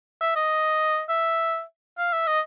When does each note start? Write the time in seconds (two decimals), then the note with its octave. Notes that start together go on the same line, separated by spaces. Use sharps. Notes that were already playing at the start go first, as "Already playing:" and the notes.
0.21 E5
0.36 D#5
1.10 E5
1.98 F5
2.13 E5
2.27 D#5